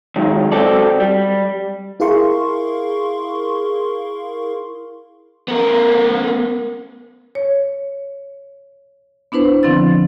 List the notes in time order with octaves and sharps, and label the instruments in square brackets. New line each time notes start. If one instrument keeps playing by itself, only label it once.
[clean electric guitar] D#3 F#3 G#3
C4 F#4 G4 A4 D5
G3
[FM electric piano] E4 G#4 A#4 F5 C6 C#6
[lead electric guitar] B3 A#4
[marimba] C#5
B3 D4 E4 B4 C5
D3 F3 C4 E4 A6